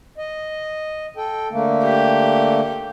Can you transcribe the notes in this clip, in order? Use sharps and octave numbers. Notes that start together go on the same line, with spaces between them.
D#5
A4 G5
D3 A3 A#3
G4